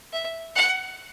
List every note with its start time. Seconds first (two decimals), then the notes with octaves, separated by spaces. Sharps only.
0.13 E5
0.56 F#5